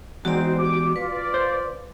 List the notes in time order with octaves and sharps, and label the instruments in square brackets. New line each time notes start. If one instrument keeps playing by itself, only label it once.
[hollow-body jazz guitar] E2 G#2 [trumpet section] C4 D#4 C5 [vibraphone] F#4 D5
[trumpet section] G4 D6
[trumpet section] F4 D5 [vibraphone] B4
[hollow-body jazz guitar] C5